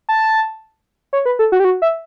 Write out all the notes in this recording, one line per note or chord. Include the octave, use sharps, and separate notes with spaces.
A5
C#5
B4
A4
F#4
G4
F#4
E5